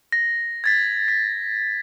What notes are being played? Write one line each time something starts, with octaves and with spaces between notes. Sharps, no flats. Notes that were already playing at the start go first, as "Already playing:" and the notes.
A#6
G#6 A6 B6
B6